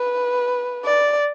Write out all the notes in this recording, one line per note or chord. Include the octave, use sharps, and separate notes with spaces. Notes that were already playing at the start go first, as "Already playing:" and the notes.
Already playing: B4
D5